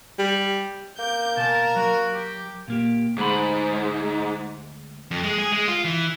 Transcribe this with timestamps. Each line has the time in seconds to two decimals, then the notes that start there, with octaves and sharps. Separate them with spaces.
0.19 G3
0.99 A#3 D6 G6
1.37 B2 A#4 G#5 A5
1.76 F#3 F#4
2.14 G4
2.68 A#2 A#3 G4
3.18 D2 G#2 G#3 B5
5.11 F2
5.24 G#3
5.38 G#4
5.52 G#3
5.68 F4
5.84 E3